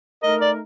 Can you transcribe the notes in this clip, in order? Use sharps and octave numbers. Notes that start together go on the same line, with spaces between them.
A3 D#4 A#4 D#5
D5